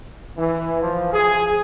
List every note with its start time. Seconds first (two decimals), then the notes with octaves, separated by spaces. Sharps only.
0.37 E3
0.82 F3
1.13 G#4